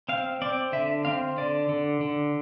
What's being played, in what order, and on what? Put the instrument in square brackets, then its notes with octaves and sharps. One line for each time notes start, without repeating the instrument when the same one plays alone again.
[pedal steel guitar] C4 F5
C4 D5
D3 E5
C4 F5
D3 D5
D3
D3